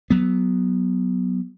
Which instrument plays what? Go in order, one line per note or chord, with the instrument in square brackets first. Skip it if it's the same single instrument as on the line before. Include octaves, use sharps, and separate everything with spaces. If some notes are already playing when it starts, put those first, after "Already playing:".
[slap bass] F#3 B3